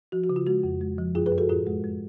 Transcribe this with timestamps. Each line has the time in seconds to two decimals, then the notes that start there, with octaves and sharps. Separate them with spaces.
0.12 F3 F#4
0.24 F#4
0.30 C#3
0.36 F4
0.47 G#3 F#4
0.64 F2
0.81 G#3
0.98 F3
1.15 F#2 F4 G#4
1.26 G#4 B4
1.32 F#2
1.38 F#4 A4
1.49 A2 F4 G#4
1.67 G#3
1.84 G#3